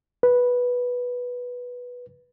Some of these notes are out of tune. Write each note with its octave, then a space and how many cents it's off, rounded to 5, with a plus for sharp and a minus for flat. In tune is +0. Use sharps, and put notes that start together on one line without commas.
B4 -10